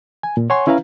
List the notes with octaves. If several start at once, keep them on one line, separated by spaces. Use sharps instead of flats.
G#5
A#2
C#5 F#5 G#5 C6 C#6
C#4 E4 B4 F5 A#5